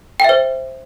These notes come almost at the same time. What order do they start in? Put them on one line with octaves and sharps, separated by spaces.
G5 E5 C5